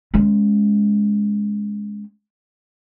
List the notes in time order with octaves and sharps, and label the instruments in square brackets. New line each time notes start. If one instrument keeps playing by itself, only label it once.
[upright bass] G#3 C#4